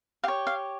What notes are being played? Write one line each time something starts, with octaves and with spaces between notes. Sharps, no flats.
G4 C#5 F5
F5